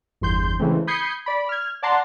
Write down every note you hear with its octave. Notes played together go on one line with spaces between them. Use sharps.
G1 E2 C6 G6
C#3 E3 G#3 A3 C4
B5 D#6 G6 G#6 C7 C#7
D5 B5
F6 G#6
D5 F#5 A5 A#5 C6